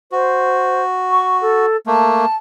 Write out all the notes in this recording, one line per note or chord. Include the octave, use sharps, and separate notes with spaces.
F#4 C5
C#6
A4
A3 A#3 A5